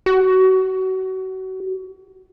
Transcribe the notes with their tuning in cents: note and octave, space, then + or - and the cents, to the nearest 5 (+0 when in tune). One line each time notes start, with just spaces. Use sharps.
F#4 +30